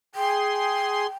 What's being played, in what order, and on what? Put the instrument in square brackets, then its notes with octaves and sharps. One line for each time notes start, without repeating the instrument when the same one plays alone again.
[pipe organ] G#4 C6 [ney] G5